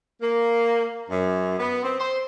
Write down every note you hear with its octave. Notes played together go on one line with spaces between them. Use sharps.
A#3
F#2
B3
C4
C5